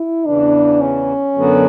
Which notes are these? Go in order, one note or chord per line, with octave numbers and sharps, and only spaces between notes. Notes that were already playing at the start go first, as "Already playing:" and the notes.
Already playing: E4
E2 C#3 E3 D4
C#4
F#2 D3 F#3 B3 F#4